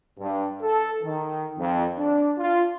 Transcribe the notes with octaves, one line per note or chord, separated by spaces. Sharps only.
G2
A4
D#3
F2
D4
F4